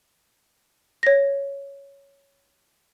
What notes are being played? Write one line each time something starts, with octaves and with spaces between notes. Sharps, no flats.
C#5 A#6